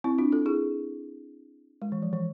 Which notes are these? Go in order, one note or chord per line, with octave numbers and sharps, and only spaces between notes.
C4 E4
D4 F4
F4 A4
E4 G#4
G#3
E3
F3
E3